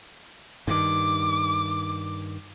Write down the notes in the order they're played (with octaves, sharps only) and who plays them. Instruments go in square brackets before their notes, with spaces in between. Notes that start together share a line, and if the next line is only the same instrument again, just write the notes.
[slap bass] G2 D#3 [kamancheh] D6